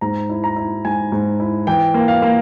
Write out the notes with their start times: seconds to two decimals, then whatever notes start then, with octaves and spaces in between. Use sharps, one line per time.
0.01 G#2 A#5
0.30 E4
0.44 A#5
0.56 E4
0.85 G#2 G#5
1.12 G#2
1.40 E4
1.67 E3 G5
1.94 A#3
2.08 F5
2.22 A#3